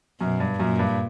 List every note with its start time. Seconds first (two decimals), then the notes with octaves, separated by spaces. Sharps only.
0.21 F#2 B2
0.40 G2
0.59 F#2 A#2
0.79 G2